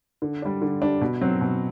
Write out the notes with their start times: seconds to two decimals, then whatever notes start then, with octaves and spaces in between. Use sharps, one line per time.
0.22 D3
0.42 G3 D4
0.62 D3
0.81 G3 D4
1.01 B2
1.21 F#3 C4
1.41 B2